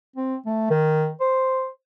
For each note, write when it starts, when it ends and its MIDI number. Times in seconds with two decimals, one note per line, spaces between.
0.16 0.35 60
0.46 0.66 57
0.70 1.10 51
1.20 1.68 72